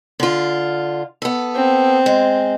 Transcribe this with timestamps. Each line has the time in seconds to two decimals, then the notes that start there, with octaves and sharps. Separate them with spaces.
0.20 D3 F4
1.22 B3 A4
1.55 C4
2.06 G#3